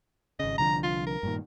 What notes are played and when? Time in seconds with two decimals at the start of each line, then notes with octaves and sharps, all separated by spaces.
0.40 G#1 C#3 D#5
0.58 C2 D3 F3 A#5
0.84 F4
1.07 A#4
1.23 G2 A#2 D#3